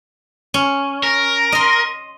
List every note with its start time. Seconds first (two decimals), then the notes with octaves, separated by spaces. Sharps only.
0.54 C#4
1.03 A#4
1.52 D#5 C6